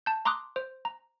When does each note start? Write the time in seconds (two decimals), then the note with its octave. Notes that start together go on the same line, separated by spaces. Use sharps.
0.06 A5 G6
0.25 A#5 C6 D6 D#6 F#6
0.56 C5
0.85 A#5